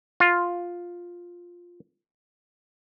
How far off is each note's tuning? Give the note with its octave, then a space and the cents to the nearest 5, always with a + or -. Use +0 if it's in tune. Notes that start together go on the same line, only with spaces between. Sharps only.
F4 +5